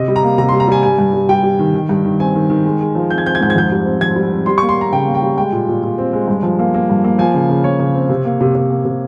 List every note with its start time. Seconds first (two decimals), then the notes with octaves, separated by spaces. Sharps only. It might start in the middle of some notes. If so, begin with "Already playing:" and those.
Already playing: C3 D#5
0.08 G3
0.16 A#5
0.23 A#3
0.38 C3 A#5
0.49 C6
0.52 G3
0.60 A#5
0.68 G3 G#5
0.83 G2 G#5
0.99 G2
1.13 G3
1.29 G3 G5
1.43 G3
1.59 D#3
1.74 D#3
1.89 G2
2.04 D#3
2.19 C4 G#5
2.35 D#3
2.50 D#3
2.66 G#3
2.81 G#3
2.95 F3
3.10 C4 G6
3.18 G#6
3.25 C4 G6
3.35 G#6
3.41 G#2 G6
3.50 G#6
3.56 F2 G6
3.72 G3
3.86 C4
4.01 F2 G#6
4.16 G3
4.32 C4
4.46 G3 C6
4.58 C#6
4.62 A#3
4.69 C6
4.77 A#3 A#5
4.93 C#3 G5
5.07 A#3
5.15 G5
5.22 G3
5.37 G#3 G5
5.52 A#2
5.68 A#2
5.83 A#2
5.98 C4
6.13 G#3
6.28 G2
6.43 F3
6.59 A#3
6.74 A#3
6.89 G2
7.04 A#3
7.19 F3 G#5
7.34 C#3
7.49 C#3
7.64 F3 C#5
7.80 C#3
7.94 C4
8.09 C3
8.25 A#3
8.41 C3
8.55 C3
8.70 A#3
8.85 C3